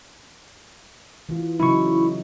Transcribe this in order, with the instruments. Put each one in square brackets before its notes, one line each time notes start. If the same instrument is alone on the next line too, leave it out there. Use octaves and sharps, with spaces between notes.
[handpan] E3 F4
[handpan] C#3 F#3 D#4 [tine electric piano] E4 C#6